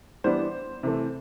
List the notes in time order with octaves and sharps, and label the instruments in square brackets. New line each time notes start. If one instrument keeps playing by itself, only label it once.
[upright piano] E3 G3 B3 D4 C5
C3 E3 A3